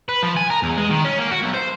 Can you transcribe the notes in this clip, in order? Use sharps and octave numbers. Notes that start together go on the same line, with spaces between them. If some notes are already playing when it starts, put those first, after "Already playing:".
B4
F3
G#5
A#4
E2
G#3
D#3
C#4
A#3
F#4
B1
C5